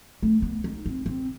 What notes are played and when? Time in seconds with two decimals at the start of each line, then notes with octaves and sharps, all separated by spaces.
0.23 A3
0.42 B3
0.64 D#4
0.86 C4
1.06 C4